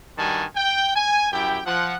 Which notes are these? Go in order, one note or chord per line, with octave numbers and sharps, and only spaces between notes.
G2 D#3 G3 F#4 G#5 A5
G5
G#5
F#2 E4 G4 G5
F3 F#5